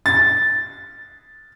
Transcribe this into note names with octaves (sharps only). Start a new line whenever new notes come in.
A6